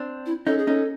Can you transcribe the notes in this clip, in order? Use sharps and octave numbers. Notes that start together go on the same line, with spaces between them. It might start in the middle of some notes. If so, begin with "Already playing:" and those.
Already playing: C4 D4
E4
C#4 D#4 A4
G#4
C#4 D#4 A4